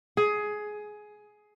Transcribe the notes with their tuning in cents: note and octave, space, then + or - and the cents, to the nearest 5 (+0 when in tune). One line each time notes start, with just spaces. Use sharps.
G#4 +15